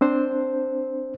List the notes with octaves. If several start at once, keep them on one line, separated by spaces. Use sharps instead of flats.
C4 D4 C5